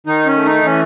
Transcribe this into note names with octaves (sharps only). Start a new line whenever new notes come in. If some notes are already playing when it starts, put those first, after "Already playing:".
D#3 D#4
C#4
A3
D#4
E3 C#4